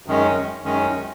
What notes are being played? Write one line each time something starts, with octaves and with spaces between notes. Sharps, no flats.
F#2 D#3 G#3 C#4
F#2 D#3 G#3 C#4